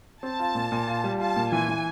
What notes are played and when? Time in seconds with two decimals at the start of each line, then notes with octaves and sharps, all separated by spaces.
0.23 C4 A5
0.39 F4
0.55 A#2
0.72 A#2
0.87 F4
1.04 G3
1.20 F4 A5
1.36 A#2
1.52 E3 G#5
1.69 E3